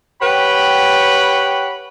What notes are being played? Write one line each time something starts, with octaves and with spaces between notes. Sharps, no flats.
G4 B4 C#5 F#5 G5 B5